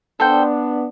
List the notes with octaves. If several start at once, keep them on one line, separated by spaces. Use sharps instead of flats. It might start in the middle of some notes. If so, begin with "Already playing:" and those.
B3 D4 A4 C5 G5